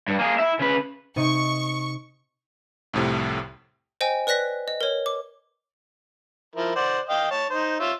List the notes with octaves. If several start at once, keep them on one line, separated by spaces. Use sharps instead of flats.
G2
A#3 G#4
E4 E5
C#3 B4
C3 D#4 C#6 D#7
C2 F2 A2 C3
C5 D#5 G5 G#5
B4 D5 F#6 A#6 B6
D#5
A#4 C#5
D6
F3 E4 A#4
C5 D5 F#5
D#5 F5 G5
C#5 A5
D#4 C5
F4 C#5 E5